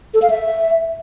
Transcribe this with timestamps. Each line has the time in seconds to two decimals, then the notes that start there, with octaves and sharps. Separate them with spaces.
0.14 A4
0.22 F5
0.30 E5